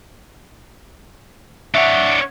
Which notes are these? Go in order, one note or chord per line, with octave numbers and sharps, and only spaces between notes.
D4 C#5 E5 F#5